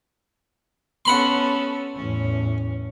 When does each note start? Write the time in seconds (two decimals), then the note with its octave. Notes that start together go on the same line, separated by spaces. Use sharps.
1.05 B3 C#4 A4 F#5 B5 C6
1.96 E2 A2 C#4